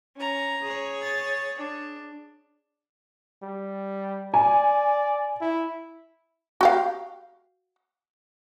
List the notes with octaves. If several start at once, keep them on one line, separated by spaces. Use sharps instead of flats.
C#4 A#5
G#4 C#5
A6
D4
G3
D5 G#5
E4
F#4 G4 F5